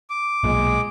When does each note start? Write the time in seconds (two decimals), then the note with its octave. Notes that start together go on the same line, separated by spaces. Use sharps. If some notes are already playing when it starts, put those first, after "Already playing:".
0.10 D6
0.44 B1 A#2 G#3